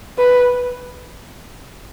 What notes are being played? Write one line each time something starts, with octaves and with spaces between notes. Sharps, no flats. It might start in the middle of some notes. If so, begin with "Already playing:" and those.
B4